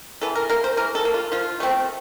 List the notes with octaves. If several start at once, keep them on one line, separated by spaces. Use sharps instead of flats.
E3 A4
A#4
A#3 A#4
C5
E3 A#4
A4
A#3
F4
F3 F4
A3 C4